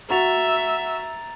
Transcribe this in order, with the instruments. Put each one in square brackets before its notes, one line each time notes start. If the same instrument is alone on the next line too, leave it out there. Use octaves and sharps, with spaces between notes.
[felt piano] F#4 [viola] E5 [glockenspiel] A#5 A6 F7